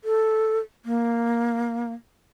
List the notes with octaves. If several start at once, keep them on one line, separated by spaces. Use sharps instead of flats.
A4
A#3